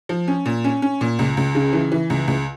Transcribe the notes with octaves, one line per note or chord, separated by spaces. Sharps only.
F3
C#4
A#2
C#4
C#4
A#2
C#2
C#2
C#3
E3
E3
C#2
C#2